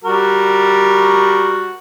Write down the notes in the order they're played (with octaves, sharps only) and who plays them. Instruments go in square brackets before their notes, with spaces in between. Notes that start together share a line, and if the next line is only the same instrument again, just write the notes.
[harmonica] G3 F#4 A#4